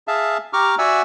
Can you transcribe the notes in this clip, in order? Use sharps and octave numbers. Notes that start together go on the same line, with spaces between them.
G#4 E5 F5 A5
G4 A#5 C#6 D6 F6
F#4 D5 E5 F#5 G#5 E6